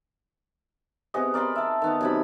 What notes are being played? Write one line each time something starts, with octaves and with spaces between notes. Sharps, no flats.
C3 B3 G#4 D#5
A#4 D5 B5 C6
E5 A5
D#3 B3
F#2 C3 B5